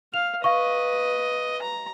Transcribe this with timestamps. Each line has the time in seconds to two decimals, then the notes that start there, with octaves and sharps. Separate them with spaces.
0.14 F5 F7
0.44 B4 D#5 F5 C#6
1.62 A#5